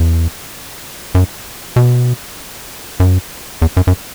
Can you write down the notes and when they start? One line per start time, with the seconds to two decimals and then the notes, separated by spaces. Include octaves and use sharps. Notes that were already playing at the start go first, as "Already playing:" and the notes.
Already playing: E2
1.15 F#2
1.76 B2
3.00 F#2
3.62 E2
3.77 F#2
3.87 F#2